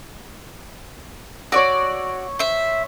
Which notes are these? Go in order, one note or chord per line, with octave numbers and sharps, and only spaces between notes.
F#4 C#5 D5 E6
C5 E5